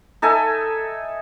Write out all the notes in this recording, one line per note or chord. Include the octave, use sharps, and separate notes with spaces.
D#4 A4 E5 G#5